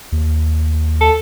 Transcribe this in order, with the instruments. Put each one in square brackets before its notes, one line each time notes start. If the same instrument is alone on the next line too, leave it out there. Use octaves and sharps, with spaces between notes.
[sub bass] D#2
[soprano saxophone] A4